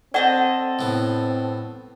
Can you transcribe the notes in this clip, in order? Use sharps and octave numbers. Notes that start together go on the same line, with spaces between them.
C4 A4 C5 D5 D#5 F#5
A2 B3